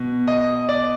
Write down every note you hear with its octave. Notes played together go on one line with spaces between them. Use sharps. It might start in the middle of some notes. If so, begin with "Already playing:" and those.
Already playing: B2
D#5
D5